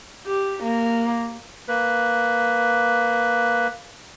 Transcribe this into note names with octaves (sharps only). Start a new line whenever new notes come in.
G4
A#3
A#3 B4